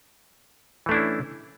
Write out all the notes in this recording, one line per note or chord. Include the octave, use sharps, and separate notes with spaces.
E3 A3 C#4 D4 E4